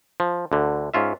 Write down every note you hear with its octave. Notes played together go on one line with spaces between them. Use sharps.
F3
D2 D3
G#2 C#4 F4 E5